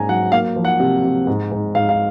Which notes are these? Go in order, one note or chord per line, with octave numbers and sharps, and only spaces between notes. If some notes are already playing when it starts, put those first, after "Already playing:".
Already playing: G#2 A#3 C#4 G#5 A#5
F#3 F#5
A#3 F5
F3
F#5
C3
C3
G#2
G#2
G#2 F5
F5